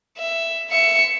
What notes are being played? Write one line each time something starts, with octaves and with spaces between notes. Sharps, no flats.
E5
E5 C#7